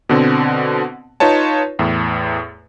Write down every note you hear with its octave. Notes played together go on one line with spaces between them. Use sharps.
B2 D3 C4
D#4 F4 B4 C#5 A5
E2 A2